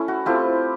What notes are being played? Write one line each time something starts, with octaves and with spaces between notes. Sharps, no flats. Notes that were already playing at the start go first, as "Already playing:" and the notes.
Already playing: A3 C#4 E4
F#4
A3 C4 E4 F4 G4